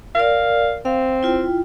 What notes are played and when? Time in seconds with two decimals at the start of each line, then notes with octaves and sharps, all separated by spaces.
0.15 A#4 D5 F5
0.85 C4 F5
1.23 E4 F4 G5